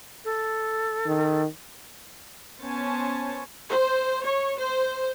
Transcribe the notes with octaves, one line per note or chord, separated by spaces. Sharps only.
A4
D#3
B3 C#4 C5 C#5 G#5 A5
C5
C#5
C5